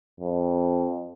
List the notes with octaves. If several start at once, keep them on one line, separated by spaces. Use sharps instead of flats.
F2